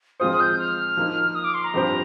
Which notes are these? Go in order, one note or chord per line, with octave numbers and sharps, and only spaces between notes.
F3 G#3 C4 F4 C5 D#6
G6
F6
F3 A#3 D#4
D#6
D6
C6
A#5
G2 F3 C4 G4 C5